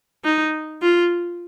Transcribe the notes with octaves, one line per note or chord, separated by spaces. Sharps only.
D#4
F4